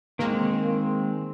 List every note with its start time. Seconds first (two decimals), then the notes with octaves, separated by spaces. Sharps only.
0.19 D#3 G#3 A#3 C4